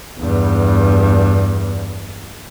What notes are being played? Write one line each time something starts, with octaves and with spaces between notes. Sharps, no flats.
E2 G2